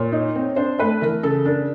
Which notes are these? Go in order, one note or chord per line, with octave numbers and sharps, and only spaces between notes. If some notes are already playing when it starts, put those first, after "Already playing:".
Already playing: A#2 C#5
D#4
C4
D4 C5
A3 B4
E3 A#4
C#3 A4
D4 A#4